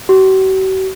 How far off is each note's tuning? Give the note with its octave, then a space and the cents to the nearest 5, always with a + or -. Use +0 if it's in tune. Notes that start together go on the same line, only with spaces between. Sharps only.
F#4 +45